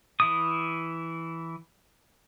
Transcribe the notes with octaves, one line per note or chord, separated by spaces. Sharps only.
E3 E4 D#6